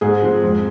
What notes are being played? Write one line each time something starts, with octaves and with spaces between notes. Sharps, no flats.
G#2 G#4
F3 G#3 C4
F2